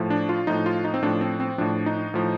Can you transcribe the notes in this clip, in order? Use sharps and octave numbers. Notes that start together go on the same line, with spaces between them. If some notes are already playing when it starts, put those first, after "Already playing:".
Already playing: A2 F3
D4
F4
A2 F3 D#4
F4
D#4
C4
A2 F3 D4
C4
C4
A2 F3 D4
D#4
A2 F3